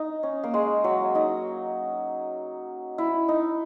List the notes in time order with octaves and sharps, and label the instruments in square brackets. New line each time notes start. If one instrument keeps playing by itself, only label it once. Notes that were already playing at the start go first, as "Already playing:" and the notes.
Already playing: [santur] D#4
C#4
A#3
G#3
F#3
D#4
E4
D#4